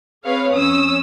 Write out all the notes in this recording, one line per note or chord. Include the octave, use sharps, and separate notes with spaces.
C4 G#4 B4 C#5 F5
F2 C#4 D#6 E6